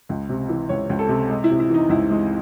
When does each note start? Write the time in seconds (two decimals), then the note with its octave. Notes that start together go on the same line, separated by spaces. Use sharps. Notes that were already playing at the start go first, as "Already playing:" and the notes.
0.09 C#2
0.29 C3
0.49 E3
0.69 C#2 C#5
0.90 C#2
0.99 A4
1.09 C3
1.29 G#3
1.44 E4
1.50 C3
1.60 E4
1.70 E3 D#4
1.89 C#2 E4
2.10 G#3